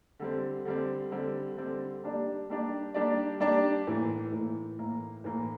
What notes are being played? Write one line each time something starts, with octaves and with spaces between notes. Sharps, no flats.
D3 G3 C4
D3 G3 C4
D3 G3 C4
D3 G3 C4
G3 A#3 D4 G4 D5
G3 A#3 D4 G4 D5
G3 A#3 D4 G4 D5
G3 A#3 D4 G4 D5
A2 E3 A#3
A2 E3 A#3
A2 E3 A#3
A2 E3 A#3